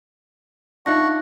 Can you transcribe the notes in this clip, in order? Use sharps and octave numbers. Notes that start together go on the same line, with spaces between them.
D4 D#4 F4 E5 F#5 C#6 F#6 A#6